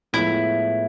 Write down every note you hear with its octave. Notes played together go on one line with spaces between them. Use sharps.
A2 F3 G#3 B3 E4